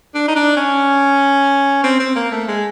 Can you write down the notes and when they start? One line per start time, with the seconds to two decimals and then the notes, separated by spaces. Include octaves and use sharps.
0.14 D4
0.28 D#4
0.36 D4
0.57 C#4
1.84 C4
2.00 C4
2.16 A#3
2.31 A3
2.48 G#3